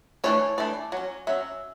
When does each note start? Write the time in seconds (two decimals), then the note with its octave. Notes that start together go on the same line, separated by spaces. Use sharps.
0.24 E3 A3 D4 C#5
0.58 E3 A3 D4 D5
0.92 F#3 C#4
1.27 F#3 C#4 E5